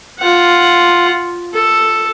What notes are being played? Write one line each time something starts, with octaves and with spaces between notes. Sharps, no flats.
F4 F#5
A4